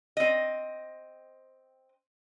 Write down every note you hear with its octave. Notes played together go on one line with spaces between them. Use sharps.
C4 D#5